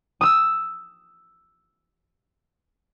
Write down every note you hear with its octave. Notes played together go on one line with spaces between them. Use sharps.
D#6 E6